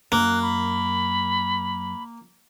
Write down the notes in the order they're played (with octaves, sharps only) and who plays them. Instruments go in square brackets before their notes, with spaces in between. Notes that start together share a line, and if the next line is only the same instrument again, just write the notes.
[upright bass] F#2 [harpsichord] A#3 [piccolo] F#6
[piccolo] B5